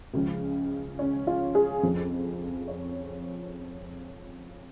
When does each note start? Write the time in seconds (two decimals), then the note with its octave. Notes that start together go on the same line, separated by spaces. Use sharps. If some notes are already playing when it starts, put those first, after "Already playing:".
0.14 C#2 C#3 F3
0.99 C#4
1.27 F4
1.55 G#4
1.83 F2 F3
2.68 C#5